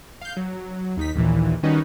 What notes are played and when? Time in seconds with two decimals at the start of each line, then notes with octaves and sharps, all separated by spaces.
0.21 F5 G6
0.37 F#3
0.97 D#2 D#4 B6
1.15 A#1 D#2 A#2 E3
1.63 D#3 G3 C#4 D#4 F#4 B4